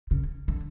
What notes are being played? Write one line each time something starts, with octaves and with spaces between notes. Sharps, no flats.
C#3
D3